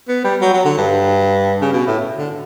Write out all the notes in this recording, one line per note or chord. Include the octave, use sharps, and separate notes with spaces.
B3
G3
F#3
F#3
D3
G2
C#3
B2
A2
D3